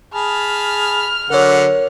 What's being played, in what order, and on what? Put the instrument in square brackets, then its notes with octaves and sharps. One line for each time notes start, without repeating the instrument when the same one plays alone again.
[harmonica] G#4 A5 B5 [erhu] F6
[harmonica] D3 F#3 F#5 [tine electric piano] A#4 C#5